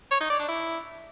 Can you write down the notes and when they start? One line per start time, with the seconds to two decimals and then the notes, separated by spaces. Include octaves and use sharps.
0.11 C#5
0.20 D#4
0.30 D5
0.39 D4
0.48 E4